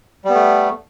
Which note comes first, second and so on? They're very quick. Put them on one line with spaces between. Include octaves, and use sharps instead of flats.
G3 B3 A3